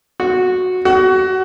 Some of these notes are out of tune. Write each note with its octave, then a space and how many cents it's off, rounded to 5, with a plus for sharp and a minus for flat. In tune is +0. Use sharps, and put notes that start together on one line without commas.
F#4 -10
F#4 +25